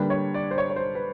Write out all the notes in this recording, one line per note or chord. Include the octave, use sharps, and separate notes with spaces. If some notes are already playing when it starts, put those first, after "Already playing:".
Already playing: D3 G3 A#3 D4 B4
C#5
D5
C5
C#5
C#5
C5
B4